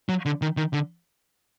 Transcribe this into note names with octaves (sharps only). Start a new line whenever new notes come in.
F#3
D3
D#3
D#3
D3